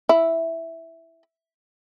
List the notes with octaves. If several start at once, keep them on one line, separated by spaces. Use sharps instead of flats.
E4